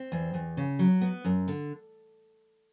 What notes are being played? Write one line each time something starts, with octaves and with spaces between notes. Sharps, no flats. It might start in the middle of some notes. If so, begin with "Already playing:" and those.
Already playing: C4
E2
E2
C#3
F#3
B3
F#2
D3